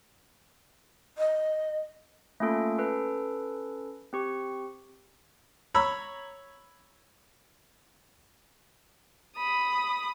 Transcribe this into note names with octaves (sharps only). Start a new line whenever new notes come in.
D#5
A3 A#3 C#4 F4 A4
C#4 A4 B4
C4 G4 C#6
C#5 A#5 B5 E6
B5 D#6